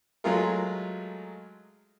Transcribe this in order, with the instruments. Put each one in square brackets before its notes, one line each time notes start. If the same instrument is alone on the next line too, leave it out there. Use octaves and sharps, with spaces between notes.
[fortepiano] F#3 G#3 A3 F4 G#4 A#4